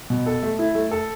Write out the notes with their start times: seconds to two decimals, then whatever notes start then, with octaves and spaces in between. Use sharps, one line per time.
0.10 B2
0.26 A4
0.43 A3
0.59 E4
0.75 A3
0.91 A4